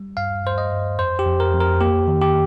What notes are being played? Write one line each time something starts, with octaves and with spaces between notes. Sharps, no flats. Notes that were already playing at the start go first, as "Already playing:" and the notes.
Already playing: G3
G2 F5
G2 C5
D#5
G2
F2 C5
G4
F2
A#4
F2
A#4
A#3 G4
D#3
G4